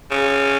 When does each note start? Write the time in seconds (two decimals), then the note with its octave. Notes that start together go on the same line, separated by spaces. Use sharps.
0.11 C#3